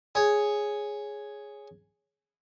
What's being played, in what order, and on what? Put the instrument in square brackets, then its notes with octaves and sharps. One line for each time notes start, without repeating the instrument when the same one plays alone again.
[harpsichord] G#4 C#5